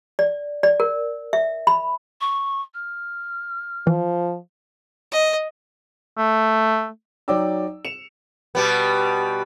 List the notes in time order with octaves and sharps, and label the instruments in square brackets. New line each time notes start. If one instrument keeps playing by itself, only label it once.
[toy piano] D5
D5
A#4
E5
B5
[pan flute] C#6
F6
[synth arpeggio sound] E3 [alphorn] F3
[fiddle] D#5
[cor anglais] A3
[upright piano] F#3 D#4 D5 G5 D6 E6
C#7 E7 F7
[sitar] B2 G3 B3